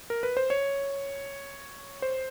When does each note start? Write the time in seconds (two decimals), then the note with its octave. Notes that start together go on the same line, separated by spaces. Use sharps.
0.10 A#4
0.23 B4
0.37 C5
0.50 C#5
2.02 C5